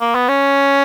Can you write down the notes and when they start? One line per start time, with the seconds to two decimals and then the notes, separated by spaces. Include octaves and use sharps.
0.01 A#3
0.15 B3
0.29 C#4